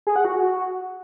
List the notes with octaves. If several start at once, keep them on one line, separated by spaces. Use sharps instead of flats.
G#4
F#5
F#4